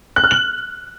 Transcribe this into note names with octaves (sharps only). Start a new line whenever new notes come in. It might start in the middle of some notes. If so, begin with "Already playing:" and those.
F#6
F6
F#7